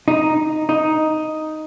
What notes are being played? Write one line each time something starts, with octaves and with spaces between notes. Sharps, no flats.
D#4
D#4